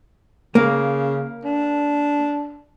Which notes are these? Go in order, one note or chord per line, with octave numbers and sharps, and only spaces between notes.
C#3 A#3
D4